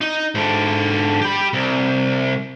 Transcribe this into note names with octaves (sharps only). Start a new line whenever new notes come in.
D#4
G#2 D3
G4 B5
C2